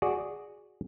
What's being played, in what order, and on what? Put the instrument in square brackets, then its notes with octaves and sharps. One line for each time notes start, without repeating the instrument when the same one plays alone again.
[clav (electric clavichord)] F#4 G#4 D5